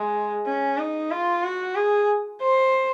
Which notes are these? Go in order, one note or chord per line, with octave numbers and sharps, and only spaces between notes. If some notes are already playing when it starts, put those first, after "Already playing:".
Already playing: G#3
C#4
D#4
F4
F#4
G#4
C5